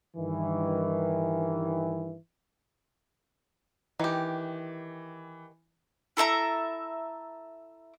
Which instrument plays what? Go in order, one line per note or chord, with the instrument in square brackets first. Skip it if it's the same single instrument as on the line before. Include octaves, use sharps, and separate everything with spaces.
[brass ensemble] G2 D#3 E3
[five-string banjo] D#3 G4 [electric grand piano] E3
[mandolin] E4 A4 E5 A#5